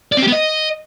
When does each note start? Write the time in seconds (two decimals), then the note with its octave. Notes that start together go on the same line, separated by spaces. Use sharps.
0.12 D5
0.17 C4
0.22 G4
0.27 B3
0.32 D#5